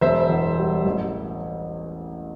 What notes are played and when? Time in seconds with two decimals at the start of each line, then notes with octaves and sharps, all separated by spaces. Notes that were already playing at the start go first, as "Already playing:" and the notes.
0.01 E1 C5 E5
0.30 E2
0.58 G3
0.85 A1